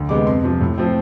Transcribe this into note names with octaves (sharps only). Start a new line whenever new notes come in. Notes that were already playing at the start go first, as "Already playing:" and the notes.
Already playing: D2
C3 G#3 B3 D6
F2 C6
C3 F3
A2
F3 A3 C4